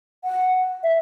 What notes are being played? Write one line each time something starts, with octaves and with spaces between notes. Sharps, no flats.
F#5
E5